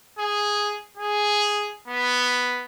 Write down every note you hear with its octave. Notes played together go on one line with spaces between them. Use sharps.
G#4
G#4
B3